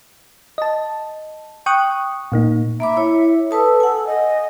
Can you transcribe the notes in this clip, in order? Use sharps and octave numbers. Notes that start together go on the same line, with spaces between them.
D#5 A5
G5 C#6 D#6 F#6
A#2 A#3 D#4
A#3 E5 B5 D6
E4 C#5
A4 B4 A5 D#6
F#5 G#5
D#5